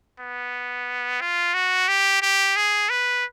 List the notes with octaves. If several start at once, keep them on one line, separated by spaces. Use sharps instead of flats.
B3
F4
F#4
G4
G4
G#4
B4